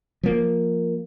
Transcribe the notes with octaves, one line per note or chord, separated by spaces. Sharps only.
F3 A#3